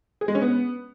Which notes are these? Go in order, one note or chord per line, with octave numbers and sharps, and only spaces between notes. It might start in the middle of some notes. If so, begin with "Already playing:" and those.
G#4
G#3
C#4
B3